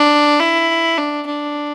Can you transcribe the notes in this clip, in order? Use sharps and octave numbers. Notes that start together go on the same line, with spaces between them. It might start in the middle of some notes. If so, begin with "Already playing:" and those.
Already playing: D4
E4
D4
D4